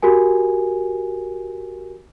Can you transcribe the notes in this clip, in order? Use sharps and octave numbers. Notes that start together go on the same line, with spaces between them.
F#4 G4 A#4 G#5